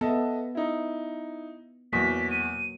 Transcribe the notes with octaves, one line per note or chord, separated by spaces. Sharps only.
B3 A4 D#5 E5
D#4 E4
E2 B2 F#3 A#3 B6
D#7